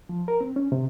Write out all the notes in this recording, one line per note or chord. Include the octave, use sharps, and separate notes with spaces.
F3
A#4
C4
C#4
C3